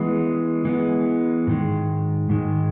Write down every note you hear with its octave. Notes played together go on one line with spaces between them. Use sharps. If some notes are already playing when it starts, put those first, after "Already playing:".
Already playing: E3 G#3 B3
E3 G#3 B3
G#2 D#3 G#3
G#2 D#3 G#3